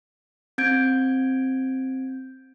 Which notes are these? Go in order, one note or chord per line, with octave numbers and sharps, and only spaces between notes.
C4 G6 G#6 D7